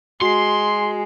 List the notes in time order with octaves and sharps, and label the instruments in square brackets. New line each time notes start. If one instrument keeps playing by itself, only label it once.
[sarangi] G#3 [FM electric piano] F#4 C7 [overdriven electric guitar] C6